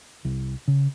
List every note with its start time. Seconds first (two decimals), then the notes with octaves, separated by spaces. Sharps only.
0.25 C2
0.68 C#3